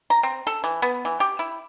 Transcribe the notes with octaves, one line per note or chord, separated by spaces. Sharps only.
A#5
C4
A4
E3
B3
E3
G4
E4